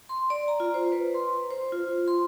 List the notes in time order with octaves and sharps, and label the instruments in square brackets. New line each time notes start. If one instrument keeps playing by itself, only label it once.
[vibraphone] C6
D5
A#5
F4
C5
B4
C6
C5
F4
C6